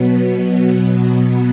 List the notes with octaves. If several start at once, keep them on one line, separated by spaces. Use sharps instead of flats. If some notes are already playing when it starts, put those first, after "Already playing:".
Already playing: B2 F#3 B3